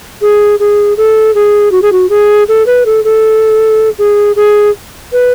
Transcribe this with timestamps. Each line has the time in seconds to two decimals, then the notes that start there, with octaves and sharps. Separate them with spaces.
0.21 G#4
0.60 G#4
0.97 A4
1.35 G#4
1.72 F#4
1.82 G#4
1.92 F#4
2.09 G#4
2.48 A4
2.66 B4
2.86 A4
3.04 A4
3.99 G#4
4.36 G#4
5.13 B4